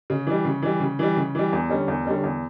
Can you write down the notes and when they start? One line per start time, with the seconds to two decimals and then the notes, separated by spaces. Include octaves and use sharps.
0.10 C#3
0.27 E3 G3
0.45 C#3
0.62 E3 G3
0.80 C#3
0.99 E3 G3
1.16 C#3
1.35 E3 G3
1.53 E2
1.69 D3 G3 C#4
1.88 E2
2.05 D3 G3 C#4
2.23 E2